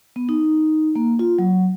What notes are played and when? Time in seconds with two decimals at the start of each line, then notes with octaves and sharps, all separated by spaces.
0.16 B3
0.29 D#4
0.96 A#3
1.19 F4
1.39 F#3